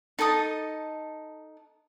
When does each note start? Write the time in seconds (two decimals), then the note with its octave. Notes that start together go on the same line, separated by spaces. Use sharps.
0.19 D#4 A4 A5 D#6